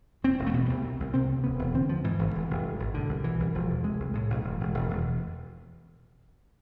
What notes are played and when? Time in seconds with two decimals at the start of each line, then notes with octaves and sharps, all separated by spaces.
0.24 E1 C4
0.39 E1
0.46 A3
0.54 B2 B3
0.69 C2
0.84 C3
1.00 C2
1.14 C3 C4
1.29 D2
1.44 E1 B3
1.59 E1
1.74 D3 C4
1.89 D2 F3
2.04 G#2 E3
2.19 G#1
2.35 F1
2.50 F1
2.65 G#2
2.79 G#1
2.94 B2 D3
3.09 C2
3.24 B2 E3
3.40 C2
3.54 E1 F3
3.70 E1
3.84 C3 G#3
4.00 C2
4.14 A2 G#3
4.30 B1
4.44 E1
4.60 E1
4.74 E1
4.90 E1